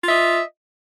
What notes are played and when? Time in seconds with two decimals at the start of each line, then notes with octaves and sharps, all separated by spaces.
0.03 F4
0.06 E5
0.09 D#5